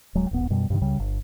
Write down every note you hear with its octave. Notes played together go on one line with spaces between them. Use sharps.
D1 F#3 G#3
D#1 A1 B3
F#2 B2 G3
G2 C3 D#3
C#2 C#3 G3
G1